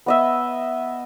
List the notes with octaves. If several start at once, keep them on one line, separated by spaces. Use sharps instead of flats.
B3 D#5 E5